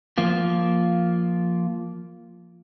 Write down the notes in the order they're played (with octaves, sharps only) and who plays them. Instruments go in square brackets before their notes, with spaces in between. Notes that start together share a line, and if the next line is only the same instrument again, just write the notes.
[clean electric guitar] F3 A#3 F4